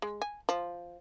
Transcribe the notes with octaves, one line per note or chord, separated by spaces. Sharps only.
G#3
G#5
F3